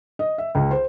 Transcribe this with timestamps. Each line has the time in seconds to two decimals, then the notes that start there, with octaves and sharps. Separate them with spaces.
0.19 D#5
0.38 E5
0.55 C#2
0.71 C5